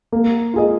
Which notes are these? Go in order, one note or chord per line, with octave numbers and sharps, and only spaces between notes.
A#3
F4 G#4 D#5